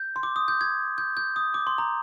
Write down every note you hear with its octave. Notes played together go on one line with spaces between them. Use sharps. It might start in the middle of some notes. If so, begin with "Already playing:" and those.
Already playing: G6
C6
D6
D#6
G6
G#6
G6
G6
D#6
D6
C6
A#5